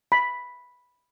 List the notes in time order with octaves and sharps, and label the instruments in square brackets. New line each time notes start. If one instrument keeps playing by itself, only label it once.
[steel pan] B5